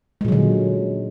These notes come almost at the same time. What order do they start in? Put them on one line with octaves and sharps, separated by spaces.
G#3 A#2 F#3 D3